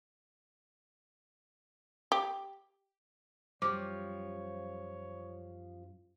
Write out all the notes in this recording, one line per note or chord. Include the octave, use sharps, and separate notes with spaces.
G4
F#2 F3 G3 C#5 D6